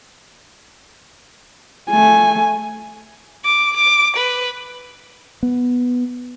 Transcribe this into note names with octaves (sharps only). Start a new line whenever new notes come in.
A3 G#5
D6
D6
B4
B3